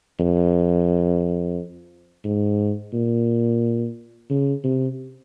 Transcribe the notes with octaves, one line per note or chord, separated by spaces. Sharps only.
F2
G#2
A#2
C#3
C3